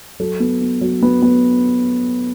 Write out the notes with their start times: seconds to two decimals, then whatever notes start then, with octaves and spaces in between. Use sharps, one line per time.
0.20 F#3 A4
0.40 B3
0.61 B3
0.81 F#3
1.03 B3
1.22 B3